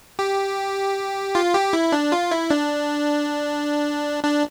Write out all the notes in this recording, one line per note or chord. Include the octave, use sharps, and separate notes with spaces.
G4
F4
G4
E4
D4
F4
E4
D4
D4